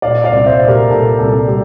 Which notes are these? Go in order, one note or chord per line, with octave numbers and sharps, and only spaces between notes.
A#2 D5 F5
D5 F5
C2
C5 E5
A#2
G4 A#4
A#2 A4
C2 A4
G3 G4